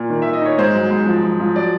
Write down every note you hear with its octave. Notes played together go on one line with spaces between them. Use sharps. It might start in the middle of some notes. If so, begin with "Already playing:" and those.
Already playing: A#2
D#3
D#3 E5
D#5
D#4 C#5
G#2 C5
F#3
G#2
F3
F3
F3
F#3 D5